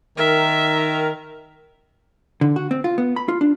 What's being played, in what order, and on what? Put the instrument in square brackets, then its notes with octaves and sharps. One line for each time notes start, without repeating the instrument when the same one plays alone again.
[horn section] D#3 A#4 [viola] E5
[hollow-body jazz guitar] D3
F#4
C4
F4
B3
B5
F4
D4